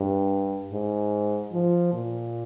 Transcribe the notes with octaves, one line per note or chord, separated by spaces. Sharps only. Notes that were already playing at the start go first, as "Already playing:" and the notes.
Already playing: G2
G#2
F3
A#2